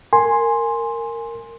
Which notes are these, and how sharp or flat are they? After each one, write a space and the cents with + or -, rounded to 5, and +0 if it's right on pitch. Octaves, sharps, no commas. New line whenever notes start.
A#4 -15 G#5 +0 C6 +5